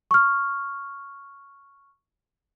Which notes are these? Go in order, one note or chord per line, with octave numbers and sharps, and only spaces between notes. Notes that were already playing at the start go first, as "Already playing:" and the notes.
C#6 F6